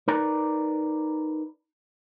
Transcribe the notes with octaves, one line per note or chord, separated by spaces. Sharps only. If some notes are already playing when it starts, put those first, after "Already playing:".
D#4 A#4 B4 D5 A#5